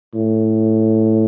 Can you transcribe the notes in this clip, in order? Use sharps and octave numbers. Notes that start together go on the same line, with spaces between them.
A2